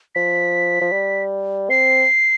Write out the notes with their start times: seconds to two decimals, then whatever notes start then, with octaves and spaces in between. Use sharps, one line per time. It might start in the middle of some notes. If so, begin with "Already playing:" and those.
0.15 F3 B6
0.81 F3
0.92 G3
1.70 C4 C7